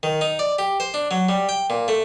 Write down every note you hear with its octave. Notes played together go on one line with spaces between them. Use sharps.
D#3
D#4
D5
G4
C5
D4
F#3
G3
G5
A#2
A3